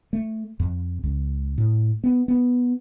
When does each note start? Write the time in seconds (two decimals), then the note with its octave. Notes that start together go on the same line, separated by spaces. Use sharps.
0.13 A3
0.60 F2
1.03 C#2
1.58 A2
2.04 B3
2.28 B3